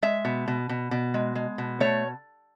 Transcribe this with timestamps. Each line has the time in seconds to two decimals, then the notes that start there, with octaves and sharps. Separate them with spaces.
0.02 G#3 E5
0.25 B2
0.48 B2
0.69 B2
0.91 B2
1.14 G#3
1.35 G#3
1.58 B2
1.80 A3 C#5